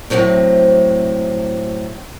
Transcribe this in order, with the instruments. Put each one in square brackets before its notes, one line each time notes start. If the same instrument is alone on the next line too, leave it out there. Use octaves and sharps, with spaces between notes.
[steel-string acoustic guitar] A2 C3 F3 F#3 C4